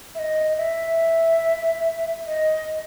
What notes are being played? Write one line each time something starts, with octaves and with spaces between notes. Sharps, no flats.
E5
D#5
E5
D#5